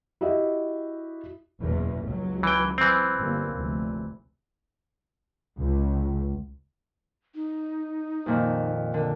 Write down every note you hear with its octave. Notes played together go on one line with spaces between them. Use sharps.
E4 F#4 G4 D#5 E5
F#1 E2 B2
C#2 F#3
E3 G5
E3 C4
G1 G3 A#3
F1 D2
C#2
D#4
F2 A#2 D#3
D3 A#4